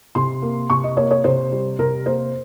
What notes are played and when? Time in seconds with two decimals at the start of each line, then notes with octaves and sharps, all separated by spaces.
0.15 C3 C6
0.42 A#3
0.70 C3 C#6
0.84 D#5
0.97 A#3 C#5
1.11 C#5
1.24 C3 C5
1.52 G3
1.79 C3 A#4
2.05 A#3 C5